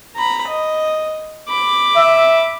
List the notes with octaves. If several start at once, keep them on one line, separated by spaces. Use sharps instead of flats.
A#5 B5
D#5
B5 D6
E5